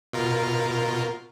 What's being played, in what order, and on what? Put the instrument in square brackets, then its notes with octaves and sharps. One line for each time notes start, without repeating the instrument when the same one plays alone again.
[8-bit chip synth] B2 F4 A#4